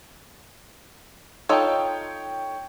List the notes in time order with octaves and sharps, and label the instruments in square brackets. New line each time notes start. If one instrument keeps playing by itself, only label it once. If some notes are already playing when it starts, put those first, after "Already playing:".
[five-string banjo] D#4 F4 A4 [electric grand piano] C#5 G5